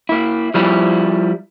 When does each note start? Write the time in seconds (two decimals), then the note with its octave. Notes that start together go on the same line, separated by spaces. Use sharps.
0.09 A#3 E4
0.54 F3 G3 E4